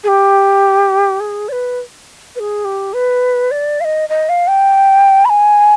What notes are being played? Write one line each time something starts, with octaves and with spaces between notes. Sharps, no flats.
G#4
G4
G#4
D5
B4
B4
G#4
G4
B4
D5
F5
D#5
D#5
F5
G5
B5
G#5